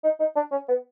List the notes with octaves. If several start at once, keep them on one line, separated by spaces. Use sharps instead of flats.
D#4
D#4
D4
C#4
B3